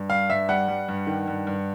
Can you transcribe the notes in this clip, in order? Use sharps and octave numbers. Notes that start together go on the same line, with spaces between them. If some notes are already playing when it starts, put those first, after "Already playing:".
Already playing: G2
G3 F5
G2 E5
G3 F#5
G3
G2
D#3
G2
G2